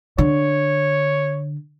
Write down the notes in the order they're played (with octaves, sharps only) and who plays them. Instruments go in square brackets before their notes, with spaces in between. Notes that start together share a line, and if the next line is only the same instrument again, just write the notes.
[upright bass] D3 [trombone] C#5